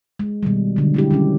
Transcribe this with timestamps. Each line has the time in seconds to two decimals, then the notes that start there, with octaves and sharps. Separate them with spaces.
0.19 G#3
0.43 B2 D#3 G3
0.76 D3 F#3
0.94 G#3 E4 G4
1.11 D#3 G3 C#4